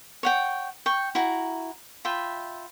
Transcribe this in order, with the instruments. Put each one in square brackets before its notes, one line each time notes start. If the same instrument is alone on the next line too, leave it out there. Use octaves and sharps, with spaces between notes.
[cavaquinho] C#5 F#5 G5
G5 C#6
E4 F#4 A#5
F4 E5 G5 B5